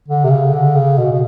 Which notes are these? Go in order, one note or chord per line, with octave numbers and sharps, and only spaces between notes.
D3
C3
C#3
D3
C#3
B2
B2